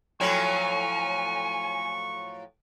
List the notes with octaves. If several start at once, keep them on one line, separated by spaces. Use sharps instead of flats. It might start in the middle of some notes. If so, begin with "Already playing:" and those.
A2 F3 F#3 G#5 C#6